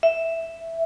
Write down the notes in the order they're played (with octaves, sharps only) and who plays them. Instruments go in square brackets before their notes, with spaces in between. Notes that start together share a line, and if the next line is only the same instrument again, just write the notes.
[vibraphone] E5